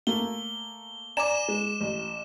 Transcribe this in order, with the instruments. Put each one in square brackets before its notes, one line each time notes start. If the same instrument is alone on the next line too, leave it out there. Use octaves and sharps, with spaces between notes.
[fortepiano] A3 A#3 [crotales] G7
[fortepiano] D5 G#5 A#5 [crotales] D6 E7
[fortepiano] G#3
A1